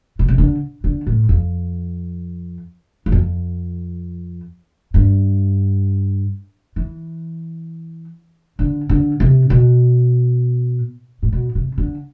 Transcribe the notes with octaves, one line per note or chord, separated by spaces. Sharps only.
B2
C3
D3
D3
A2
F2
E2
F2
G2
E3
D3
D3
C3
B2
A2
B2
C3
D3